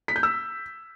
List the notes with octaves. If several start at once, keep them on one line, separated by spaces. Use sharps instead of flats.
B6
G6
E6